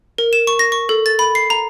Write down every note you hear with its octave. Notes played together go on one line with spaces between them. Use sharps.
A#4
E7
C#6
A#6
C#6
A4
A6
B5
C7
A#5